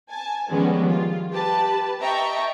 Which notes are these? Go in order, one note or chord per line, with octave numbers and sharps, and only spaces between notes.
G#5 A5
D#3 F3 G3 G#3 B3 C#4
F4
G4 B4 A5
D#5 E5 G5 A5 A#5 C#6